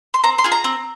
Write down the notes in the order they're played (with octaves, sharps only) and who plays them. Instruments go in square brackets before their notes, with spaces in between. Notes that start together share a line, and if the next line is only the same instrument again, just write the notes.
[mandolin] C6
C4 A#5
C6
F4 G#4
A#5
C4